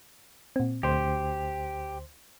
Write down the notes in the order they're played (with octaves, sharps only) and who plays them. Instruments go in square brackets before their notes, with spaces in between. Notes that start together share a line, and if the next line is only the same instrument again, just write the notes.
[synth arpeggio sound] A#2 C4
[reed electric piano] D2 C5 C6 [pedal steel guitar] G4